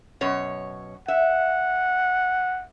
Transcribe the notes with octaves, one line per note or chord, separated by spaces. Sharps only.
F#2 B2 C#5
E5 F#5